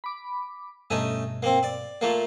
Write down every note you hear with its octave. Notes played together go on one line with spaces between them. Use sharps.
B5 D6
G2 B2 A3 C#4 D#4
A#3 C4
D5
A#2 A3 A#3